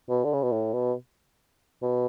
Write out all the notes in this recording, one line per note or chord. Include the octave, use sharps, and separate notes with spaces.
B2
D3
C#3
B2
A2
B2
B2